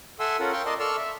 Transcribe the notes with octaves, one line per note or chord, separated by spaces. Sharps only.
A4 E5 F#5 G#5 C6 E6
C#4 F4 A4 A#4 F#5
F5 G5 C6 C#6
A#4 D5 D#5 A5 C6
A4 D5 C6 C#6 E6 F6
E5